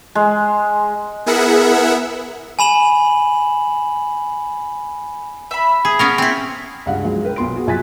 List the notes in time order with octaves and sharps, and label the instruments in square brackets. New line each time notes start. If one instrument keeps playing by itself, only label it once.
[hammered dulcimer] G#3
[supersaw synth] B3 E4 G#4 A#4 E5 F#5
[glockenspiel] G#5 B5 E7 F#7
[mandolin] E5 B5
[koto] G#4
B3 C#4 A#4
C4 E4
[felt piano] C#2 G2 F5 F#5
F3 F#3 G#3
A#4 B4 G5
B1 B3 C6 D7
F#4 G#4
A#1 F#3 G#5 F#6 A6 B6